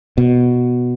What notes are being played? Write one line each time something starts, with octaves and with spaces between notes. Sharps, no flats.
B2